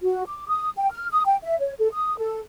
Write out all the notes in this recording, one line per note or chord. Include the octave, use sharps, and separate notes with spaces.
F#4
D6
D#6
G5
F6
D#6
G5
E5
C#5
A4
D#6
A4